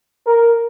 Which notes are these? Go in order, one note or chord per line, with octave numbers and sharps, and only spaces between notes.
A#4